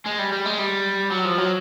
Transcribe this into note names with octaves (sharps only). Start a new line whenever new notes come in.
G#3
G3
G3
G#3
G3
F#3
F3
F#3